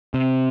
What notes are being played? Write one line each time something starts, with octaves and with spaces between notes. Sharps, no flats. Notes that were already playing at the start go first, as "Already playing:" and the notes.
C3